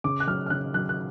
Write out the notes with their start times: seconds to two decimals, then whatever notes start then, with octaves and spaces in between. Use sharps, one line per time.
0.04 C#3 D6
0.20 F#6
0.27 F#3 F6
0.46 F6
0.50 C#3 F#6
0.74 F#3 F#6
0.89 F#6